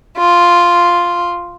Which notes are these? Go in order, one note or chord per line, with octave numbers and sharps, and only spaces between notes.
F4